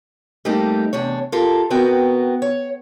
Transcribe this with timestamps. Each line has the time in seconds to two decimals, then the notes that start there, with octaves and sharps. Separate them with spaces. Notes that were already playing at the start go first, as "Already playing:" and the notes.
0.45 G3 A3 A#3 C4 D#4 G4
0.93 E2 C3 D4 C#5
1.32 F4 G4 A4 A#4
1.70 B3 C4 F#4 A#4 B4 G5
2.42 C#5